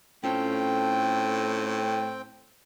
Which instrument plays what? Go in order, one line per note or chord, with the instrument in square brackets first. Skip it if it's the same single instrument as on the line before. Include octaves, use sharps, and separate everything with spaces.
[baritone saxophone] A2 [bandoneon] C4 G5 [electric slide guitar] C#4 F4 A4